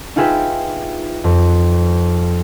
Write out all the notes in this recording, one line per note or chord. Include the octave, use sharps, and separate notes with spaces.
D#4 F4 G#4 B4 E5 G5
F2